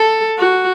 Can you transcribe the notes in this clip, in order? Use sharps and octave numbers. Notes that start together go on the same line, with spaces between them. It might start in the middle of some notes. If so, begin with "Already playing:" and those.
Already playing: A4
F#4